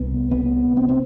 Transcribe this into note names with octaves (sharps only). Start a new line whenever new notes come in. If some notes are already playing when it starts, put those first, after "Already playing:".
Already playing: C2 B3
C3 B3
C3 C4
C4